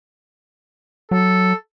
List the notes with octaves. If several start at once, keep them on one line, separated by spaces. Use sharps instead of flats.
F#3 A4